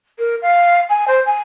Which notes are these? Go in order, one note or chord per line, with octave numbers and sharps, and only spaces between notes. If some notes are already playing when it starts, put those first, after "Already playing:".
A#4
F5
G#5
C5
G#5